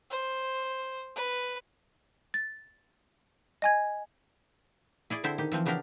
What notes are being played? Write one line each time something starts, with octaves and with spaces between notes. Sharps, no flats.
C5
B4
A6
D#5 G#5 G#6
E4 G#4 D5
D3 C4 E4 C5 E5
D#3 G4
E3 F3 C4
C#3 B3 D4 G4 A#4